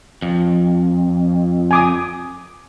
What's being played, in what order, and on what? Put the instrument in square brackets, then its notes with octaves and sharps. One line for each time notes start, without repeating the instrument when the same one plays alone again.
[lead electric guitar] F2
[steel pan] G#5 D6 D#6